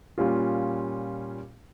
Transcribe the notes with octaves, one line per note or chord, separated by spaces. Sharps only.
A#2 G3 C#4 F4